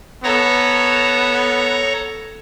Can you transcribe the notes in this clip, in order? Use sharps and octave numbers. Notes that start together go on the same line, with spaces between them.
B3 A4 C#5 A#5